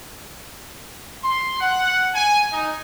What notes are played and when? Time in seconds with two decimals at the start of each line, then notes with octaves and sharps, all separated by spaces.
1.22 C6
1.61 F#5
2.14 G#5
2.52 D#4